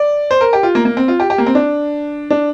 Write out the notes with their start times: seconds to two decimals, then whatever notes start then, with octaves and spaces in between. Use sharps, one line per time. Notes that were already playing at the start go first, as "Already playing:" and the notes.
Already playing: D5
0.31 C5
0.41 A#4
0.53 G4
0.63 F4
0.75 A#3
0.85 A#3
0.97 C4
1.08 F4
1.20 G4
1.30 G4
1.38 A#3
1.46 C4
1.55 D4
2.30 D4